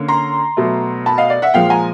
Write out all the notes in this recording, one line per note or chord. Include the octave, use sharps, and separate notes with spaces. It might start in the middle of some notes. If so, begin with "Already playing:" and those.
Already playing: D3 A#3 C#4
A#5 C6
B2 F#3 A3
A5 B5
D#5 F5
D5
E5 F#5
A#2 F3 G#3 F5 G5
G#5 A#5